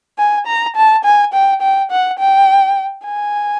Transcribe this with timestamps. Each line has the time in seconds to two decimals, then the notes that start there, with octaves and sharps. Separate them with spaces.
0.18 G#5
0.47 A#5
0.76 A5
1.05 G#5
1.33 G5
1.62 G5
1.91 F#5
2.19 G5
3.05 G#5